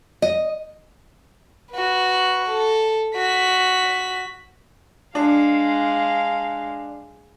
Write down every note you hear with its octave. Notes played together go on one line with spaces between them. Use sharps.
D#5
F#4 B4
A4
F#4 B6
G#3 D4 F5